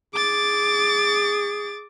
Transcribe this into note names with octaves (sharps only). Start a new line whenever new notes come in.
G#4 D6 A6